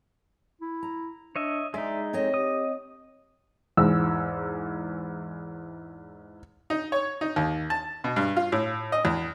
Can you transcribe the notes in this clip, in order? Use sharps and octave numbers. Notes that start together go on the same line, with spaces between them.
E4
A#5
D4 C#5 D#5 E5
G#3 D#4 D5 E5
C4 A4 C#5 D#5
G4 D#6
E2 G#2 E6
D#4
C#5
D#4
D#2
A5
B2
G2
F4
A2
D#5
E2